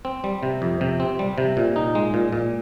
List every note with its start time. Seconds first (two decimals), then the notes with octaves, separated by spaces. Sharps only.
0.05 C4
0.24 G3
0.43 C3
0.62 F2
0.81 C3
1.00 C4
1.19 G3
1.38 C3
1.57 A#2
1.76 D#4
1.95 G#3
2.14 A#2
2.32 A#2